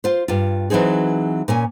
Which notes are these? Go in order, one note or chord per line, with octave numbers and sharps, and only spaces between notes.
F4 C5
G2 F4
E3 F#3 C4 D#4 G#4
A#2 C#4 G#5